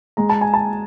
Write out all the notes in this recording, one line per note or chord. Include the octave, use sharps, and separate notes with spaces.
G#3 A#5
A5
G#5
A5